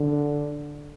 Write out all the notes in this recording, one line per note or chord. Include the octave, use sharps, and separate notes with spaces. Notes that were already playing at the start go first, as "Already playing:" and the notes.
Already playing: D3